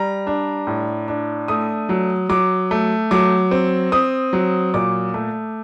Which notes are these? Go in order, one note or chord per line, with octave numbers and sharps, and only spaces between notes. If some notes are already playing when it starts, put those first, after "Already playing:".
Already playing: G3 A#5
D4
A2
D4
A3 D#6
F#3
F#3 D6
A3
F#3 D6
C4
C4 D#6
F#3
A#2 D6
A3